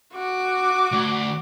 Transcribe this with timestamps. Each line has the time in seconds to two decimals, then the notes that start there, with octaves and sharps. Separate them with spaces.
0.14 F#4 D6
0.92 D2